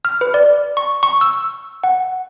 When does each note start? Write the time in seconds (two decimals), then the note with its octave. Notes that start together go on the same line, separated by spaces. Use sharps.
0.05 F6
0.21 B4
0.34 D5
0.77 C#6
1.03 C#6
1.21 E6
1.84 F#5